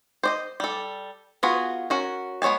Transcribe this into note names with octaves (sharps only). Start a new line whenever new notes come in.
C5 D5 D#5
G3 A4
B3 F4 F#4 G#4
C#4 F#4 A#4
G#3 B3 C#5 G#5 A5